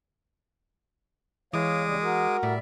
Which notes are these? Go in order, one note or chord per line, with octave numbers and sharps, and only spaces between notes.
E3 G#3 C#5 F5 D6 D#6
D#2 C#3 G3
F#4 A#4
A2 G3 D5 E5